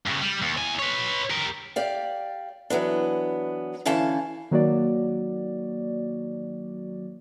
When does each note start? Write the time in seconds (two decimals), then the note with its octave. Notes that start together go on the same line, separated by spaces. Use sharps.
0.06 G2 C#3
0.22 G3
0.42 D#2
0.58 E2 G#5
0.79 B4 C#5
1.30 G4 A#4
1.76 G4 D5 F5
2.70 E3 F#3 B3 D4
3.86 D3 E3 C#4 F5 A5
4.51 D#3 F#3 A#3 F#4 D5